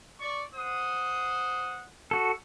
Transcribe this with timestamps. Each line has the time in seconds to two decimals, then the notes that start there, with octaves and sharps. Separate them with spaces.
0.20 D5 C#6
0.55 C5 F#5 D#6
2.11 F#4 A4